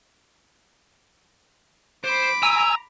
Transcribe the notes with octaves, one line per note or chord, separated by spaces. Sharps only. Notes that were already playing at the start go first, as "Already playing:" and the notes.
C5 B5 D6
G#5 A#5 E6